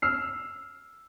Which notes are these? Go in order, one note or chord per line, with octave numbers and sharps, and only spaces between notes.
E6 F6 C7